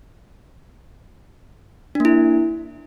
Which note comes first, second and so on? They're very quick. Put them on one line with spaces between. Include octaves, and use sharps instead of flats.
D4 A#3 E4